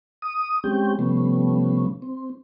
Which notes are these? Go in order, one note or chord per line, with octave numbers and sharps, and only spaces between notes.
D#6
G#3 C4 C#4 G4 G5
C3 F3 G3 A3 B3 C#4
C4